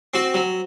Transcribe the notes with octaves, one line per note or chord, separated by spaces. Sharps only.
C4 F#4
F#3